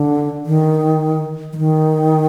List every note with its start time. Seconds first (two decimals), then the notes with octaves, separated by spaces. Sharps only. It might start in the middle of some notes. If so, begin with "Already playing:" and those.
Already playing: D3
0.46 D#3
1.53 E3
1.58 D#3